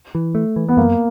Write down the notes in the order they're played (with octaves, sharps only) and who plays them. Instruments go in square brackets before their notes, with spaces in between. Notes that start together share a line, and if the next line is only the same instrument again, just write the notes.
[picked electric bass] E3
A3
E3
[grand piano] B3
[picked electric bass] F#2 [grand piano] A#3